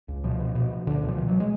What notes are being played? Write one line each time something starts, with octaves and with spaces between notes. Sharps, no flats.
C#2
B2 F3
B2
B2
B2
C#2 D3
B2
F3
B2
F#3
G#3